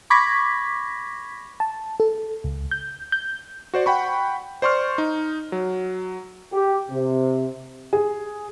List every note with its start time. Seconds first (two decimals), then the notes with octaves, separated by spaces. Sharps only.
0.10 B5 C#6 D6 G#6 A#6 B6
1.60 A5
2.00 A4
2.44 C#2
2.71 G6
3.12 G6
3.74 F#4 C5 D5
3.86 F#5 G5 B5 C#6
4.62 C5 D5 C6 C#6 F6
4.98 D#4
5.52 F#3
6.52 G4
6.91 C3
7.93 G#4